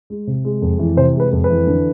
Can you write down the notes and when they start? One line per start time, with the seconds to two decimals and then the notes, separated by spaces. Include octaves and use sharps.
0.10 G#3
0.27 C3
0.45 G#3
0.62 F2
0.79 E3
0.97 C3 C5
1.15 G#3 B4
1.32 F2
1.44 B4
1.50 E3
1.67 D3